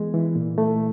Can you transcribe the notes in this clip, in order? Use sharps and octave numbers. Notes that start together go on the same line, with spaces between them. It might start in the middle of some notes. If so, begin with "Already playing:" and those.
Already playing: E3 G#3 B3
E3
A#2
A3